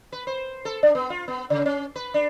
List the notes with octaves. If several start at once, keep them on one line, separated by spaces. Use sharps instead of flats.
B4
C5
A4
D4
B3
F4
B3
C#3
C#4
B4
D4